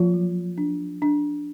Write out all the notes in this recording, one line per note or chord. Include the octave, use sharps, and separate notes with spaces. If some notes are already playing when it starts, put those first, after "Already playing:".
Already playing: F3 A#3 F4
F#3
D4
D4